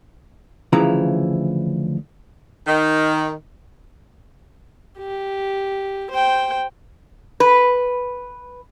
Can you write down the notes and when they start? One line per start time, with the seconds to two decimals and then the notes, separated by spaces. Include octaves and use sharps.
0.73 D2 C#3 E3 F3 E4 A#5
2.67 D#3
4.99 G4
6.10 C5 G5
7.40 B4